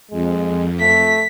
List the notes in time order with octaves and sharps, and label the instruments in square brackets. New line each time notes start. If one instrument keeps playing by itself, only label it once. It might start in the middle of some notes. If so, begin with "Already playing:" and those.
[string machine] F2 [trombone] G#3
[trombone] A3 [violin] B6